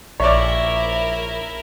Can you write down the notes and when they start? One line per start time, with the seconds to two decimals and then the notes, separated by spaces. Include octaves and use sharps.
0.20 A#1 E4 A#4 C#5 D5 E5